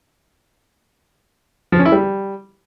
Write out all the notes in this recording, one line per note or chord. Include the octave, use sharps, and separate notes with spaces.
F3
C#4
E4
G3